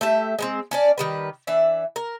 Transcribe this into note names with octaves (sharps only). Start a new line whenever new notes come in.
A3 G4 E5
G#3 B3 C4
C#4 D4 D5
D#3 G3 B4
E3 D4 E5
A#4